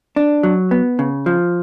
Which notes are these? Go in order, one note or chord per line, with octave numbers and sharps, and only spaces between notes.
D4
F#3
B3
C#3
F3